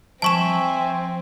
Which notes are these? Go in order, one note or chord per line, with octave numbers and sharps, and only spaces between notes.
F3 C4 E5 G#5 A5 C#6 E7